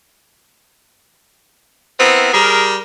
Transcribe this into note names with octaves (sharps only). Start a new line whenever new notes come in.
B3 C4 E4 A#4
G3 G#4 A#4